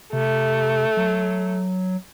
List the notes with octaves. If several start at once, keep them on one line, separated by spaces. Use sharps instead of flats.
C3 A3
F#3